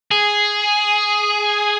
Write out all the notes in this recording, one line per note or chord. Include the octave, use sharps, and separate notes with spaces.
G#4